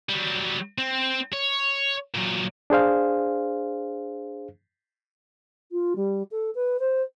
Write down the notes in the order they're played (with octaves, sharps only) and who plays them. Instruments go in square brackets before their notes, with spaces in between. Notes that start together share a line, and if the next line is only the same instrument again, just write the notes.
[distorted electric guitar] F#3 G3
C4
C#5
A#2 F#3
[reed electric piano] D4 G#4 C5 F5
[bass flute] F4
G3
A4
B4
C5